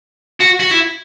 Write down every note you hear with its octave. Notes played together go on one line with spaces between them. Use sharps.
F#4
F#4
E4